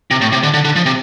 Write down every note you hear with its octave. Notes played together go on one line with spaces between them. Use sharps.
C3
A2
C3
D3
D3
D3
F3
C3